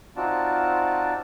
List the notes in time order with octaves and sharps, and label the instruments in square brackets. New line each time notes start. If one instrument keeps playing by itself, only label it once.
[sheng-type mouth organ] C4 D#4 F4 F#4 D5 A5